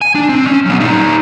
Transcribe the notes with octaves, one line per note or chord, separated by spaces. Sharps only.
G#5
D4
C4
C#4
F#3 B3
G3 D#4